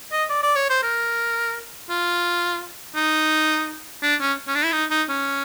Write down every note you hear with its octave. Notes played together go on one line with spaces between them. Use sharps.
D#5
D5
D5
C#5
C5
A#4
F4
D#4
D4
C#4
C#4
D4
E4
D#4
D#4
C#4